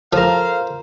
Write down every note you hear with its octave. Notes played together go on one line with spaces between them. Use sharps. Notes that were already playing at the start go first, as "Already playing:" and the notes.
F3 F4 A4 A#4 C5 F5